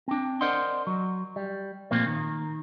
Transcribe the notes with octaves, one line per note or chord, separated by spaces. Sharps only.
C4 D4
A#4 C5 D5 D#5 F#5 C6
F#3
G3
A#2 F3 A3 A#3 C4
D#3